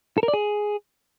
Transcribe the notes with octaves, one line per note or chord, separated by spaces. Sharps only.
A4
A#4
D5
G#4